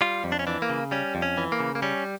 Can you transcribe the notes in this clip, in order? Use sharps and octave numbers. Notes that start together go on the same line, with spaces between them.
G3 F4
F2
D4
C#4
E3 D4
A#3
C#3
G3 C#4
F2
C#4
E3
A#3
C#3
A#3
G3 C#4